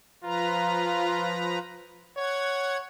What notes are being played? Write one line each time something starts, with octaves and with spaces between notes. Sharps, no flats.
F3 F4 B4 A#5
C#5 F#5 G#6